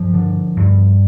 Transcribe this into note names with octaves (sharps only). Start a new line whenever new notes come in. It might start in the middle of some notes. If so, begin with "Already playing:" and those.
Already playing: G2 F3
D3
G2